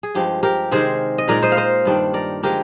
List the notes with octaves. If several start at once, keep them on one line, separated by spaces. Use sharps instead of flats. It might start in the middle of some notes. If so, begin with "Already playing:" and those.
G#4
G2 F3 G#3 G4
G4 A#4
C3 D#3 G#3 G#4 C5
D#5
A#2 G#3 D#4 A#4 D5
C5 D#5
F5
C5 D#5
G2 D#3 G3 D4
A#4 D5
D3 F3 G#3 G4 A#4